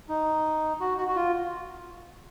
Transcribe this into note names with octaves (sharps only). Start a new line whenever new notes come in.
D#4
F#4
F#4
F#4
F4